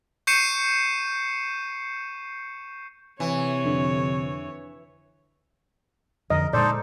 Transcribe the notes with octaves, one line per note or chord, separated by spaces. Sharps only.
C#6 G6 C7 C#7 D#7 E7
C3 E3 C#5
F2 D3
F2 D3 F3 A#4 D#5
A#2 G#3 D#4 A4 C5 D5